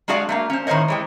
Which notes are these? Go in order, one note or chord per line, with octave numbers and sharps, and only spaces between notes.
G#3 D4 F#4 G#4 D5 F5
A3 A#3 F5
C#4 C5
A2 D#3 D4 C5 C#5 D#5
E3 G#3 G5